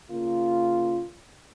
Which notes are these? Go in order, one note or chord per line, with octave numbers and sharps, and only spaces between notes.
C#3 A#3 F4